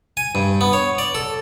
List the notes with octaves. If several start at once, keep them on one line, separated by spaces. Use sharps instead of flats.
G#5
G2
B3
C#5
D5
A4